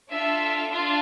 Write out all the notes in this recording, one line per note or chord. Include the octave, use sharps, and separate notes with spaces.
D4 F4 A4 E5
D4 F4